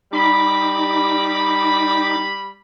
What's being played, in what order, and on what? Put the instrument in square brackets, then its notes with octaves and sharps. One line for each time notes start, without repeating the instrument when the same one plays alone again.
[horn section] G3 B5 [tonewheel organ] D#4 D6